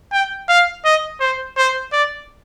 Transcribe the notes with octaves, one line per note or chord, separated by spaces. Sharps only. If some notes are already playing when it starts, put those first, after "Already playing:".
G5
F5
D#5
C5
C5
D5